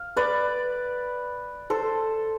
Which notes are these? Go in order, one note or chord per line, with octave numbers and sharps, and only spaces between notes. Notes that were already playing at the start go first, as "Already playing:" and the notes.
Already playing: F5
B4 D5
A4 C5